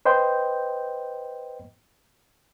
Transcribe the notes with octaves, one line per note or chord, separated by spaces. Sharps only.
B4 C5 D#5 G5 G6